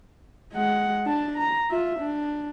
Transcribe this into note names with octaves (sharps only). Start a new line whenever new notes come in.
G#3 F#5
D4 A5
A#5
F4 E5
D4